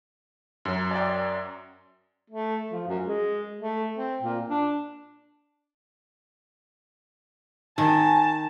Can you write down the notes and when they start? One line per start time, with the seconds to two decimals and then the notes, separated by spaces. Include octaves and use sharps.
0.65 F#2 F#3
0.91 D5 G5
2.30 A3
2.70 F3
2.88 F#2
3.05 G#3
3.61 A3
3.97 C4
4.21 A#2
4.50 D4
7.78 D#3 G#5 A5